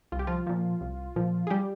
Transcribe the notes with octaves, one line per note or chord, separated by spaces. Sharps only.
C2 F4
G4
F3 F4
A#2 F3
C2
A#2 F3
G#4
G3 G4